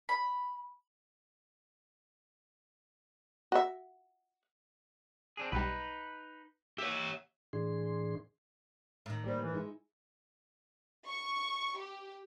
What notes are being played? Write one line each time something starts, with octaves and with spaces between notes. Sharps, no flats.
B5
F#4 E5
C4 D4 G#4
B1 G3 D#4 B4
G4 C#5 E5
A2 E3 D4 G#4 C6
A2 D#3
G3 A#3 G4 C5
E3
G#3 D#4 E4
C#6
G4